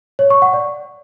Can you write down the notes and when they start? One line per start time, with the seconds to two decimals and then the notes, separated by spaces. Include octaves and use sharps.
0.19 C#5
0.30 C#6
0.42 F#5
0.54 D5